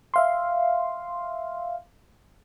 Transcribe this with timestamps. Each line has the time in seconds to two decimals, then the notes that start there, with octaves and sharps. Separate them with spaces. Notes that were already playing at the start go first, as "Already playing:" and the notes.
0.14 E5 F5 C6